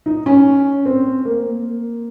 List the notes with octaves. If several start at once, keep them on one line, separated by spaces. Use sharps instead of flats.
D#4
C#4
C4
A#3